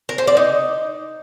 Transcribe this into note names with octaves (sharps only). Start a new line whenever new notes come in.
A#4
C5
D5
D#4